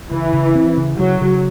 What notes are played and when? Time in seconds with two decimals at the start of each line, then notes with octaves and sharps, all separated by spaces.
0.11 C#3 E3
0.33 C#3
0.55 C4
0.77 C#3
0.99 C#3 F#3
1.21 C#3